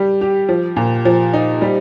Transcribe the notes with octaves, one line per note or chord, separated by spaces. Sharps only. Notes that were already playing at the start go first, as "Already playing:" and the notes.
Already playing: G3 G4
G4
F3
A#2
F3
D#4
G3